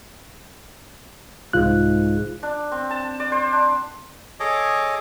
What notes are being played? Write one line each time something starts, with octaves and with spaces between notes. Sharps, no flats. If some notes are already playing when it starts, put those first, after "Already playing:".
C2 G#2 F4 F#6
D4
C4
A5
D5
C5
D4
G#4 A4 C#5 D#5 D6